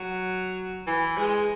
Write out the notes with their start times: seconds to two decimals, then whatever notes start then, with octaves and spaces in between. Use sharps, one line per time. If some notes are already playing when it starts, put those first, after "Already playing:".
Already playing: F#3
0.87 E3
1.17 G#3